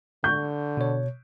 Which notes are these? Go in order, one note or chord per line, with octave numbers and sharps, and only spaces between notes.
D3 C#6 G6
B2 C#5